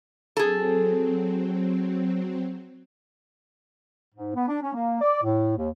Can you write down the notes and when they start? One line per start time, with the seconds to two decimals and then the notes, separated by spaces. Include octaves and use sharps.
0.37 F#3 C4 G#4 A4
4.15 G#2
4.35 B3
4.48 D4
4.63 C#4
4.74 A#3
5.02 D5
5.23 A2
5.57 D#2